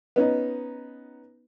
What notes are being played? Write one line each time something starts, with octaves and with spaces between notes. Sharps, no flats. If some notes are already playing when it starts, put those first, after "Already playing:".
B3 C#4 D#4